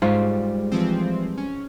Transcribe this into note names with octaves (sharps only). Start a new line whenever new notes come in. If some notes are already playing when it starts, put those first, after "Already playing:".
G#2 G3 G#3 F4 F5
E3 F3 C4
C#4